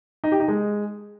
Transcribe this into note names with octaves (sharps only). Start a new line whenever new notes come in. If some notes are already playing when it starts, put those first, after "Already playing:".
D#4
G4
D#4
G#3